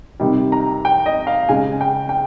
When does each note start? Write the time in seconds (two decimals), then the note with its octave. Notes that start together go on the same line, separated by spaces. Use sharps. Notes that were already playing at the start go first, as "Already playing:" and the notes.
0.20 C3 D#3 G3
0.52 A#5
0.85 G5
1.06 D#5
1.27 F5
1.49 C#3 G#3 G#5
1.81 G5
2.09 G5